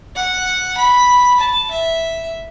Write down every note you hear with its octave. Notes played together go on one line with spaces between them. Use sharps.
F#5
B5
A5
E5